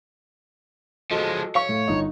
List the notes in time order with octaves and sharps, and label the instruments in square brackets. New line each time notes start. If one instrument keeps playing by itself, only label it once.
[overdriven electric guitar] F3 G#3 [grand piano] F#4 A4 D#5
[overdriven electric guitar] C#5 [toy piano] F5 C#6
[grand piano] A2
G1 D#4